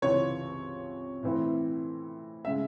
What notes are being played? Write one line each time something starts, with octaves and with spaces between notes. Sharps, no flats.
C#2 C3 E3 C4 C#5
A2 E3 C4 E4
C#3 G#3 E5